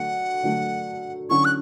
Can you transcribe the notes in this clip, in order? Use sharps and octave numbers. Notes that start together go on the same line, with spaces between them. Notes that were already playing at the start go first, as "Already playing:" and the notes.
Already playing: D3 F#3 A3 F#5
D3 F#3 A3 D4
D3 F#3 C#4 E4 C#6
F#6